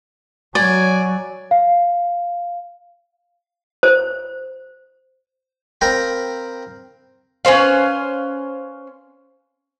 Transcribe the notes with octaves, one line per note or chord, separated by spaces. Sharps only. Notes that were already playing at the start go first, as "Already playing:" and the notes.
F#3 D5 G#5
F5
C5
C4 A#4 F5 G5 A#5 B5
C#4 B4 C5 F5